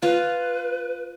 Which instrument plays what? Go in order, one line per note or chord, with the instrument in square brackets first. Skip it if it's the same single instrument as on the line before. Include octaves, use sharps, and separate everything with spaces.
[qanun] F4 F5 [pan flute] B4